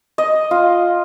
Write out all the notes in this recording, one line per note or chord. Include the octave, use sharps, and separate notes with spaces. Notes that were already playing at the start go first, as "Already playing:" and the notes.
D#5
F4